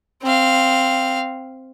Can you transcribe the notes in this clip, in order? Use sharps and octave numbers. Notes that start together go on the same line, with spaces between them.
C4 F5